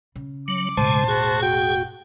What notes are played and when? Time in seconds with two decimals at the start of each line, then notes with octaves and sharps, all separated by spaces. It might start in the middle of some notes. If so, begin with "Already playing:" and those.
0.16 C#3
0.48 F#3 D6
0.77 E1 A2 C#3 G#3 C5 A5
1.08 F#4 G#4
1.42 F#4 G5